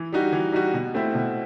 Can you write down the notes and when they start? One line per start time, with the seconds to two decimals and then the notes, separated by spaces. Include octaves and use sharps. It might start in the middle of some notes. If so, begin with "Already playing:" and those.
Already playing: E3
0.13 G3 D#4 F#4
0.32 E3
0.52 G3 D#4 F#4
0.74 B2
0.94 A3 C4 E4
1.15 B2